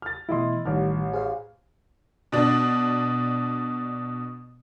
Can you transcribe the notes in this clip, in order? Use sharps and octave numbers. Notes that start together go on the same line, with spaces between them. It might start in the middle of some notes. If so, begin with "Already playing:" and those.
F6 A6
B2 E3 A3 E4 D#5 C6
A1 D#3 G3 F6
G#4 C5 F5
B2 D4